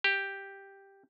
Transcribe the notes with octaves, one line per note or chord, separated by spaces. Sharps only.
G4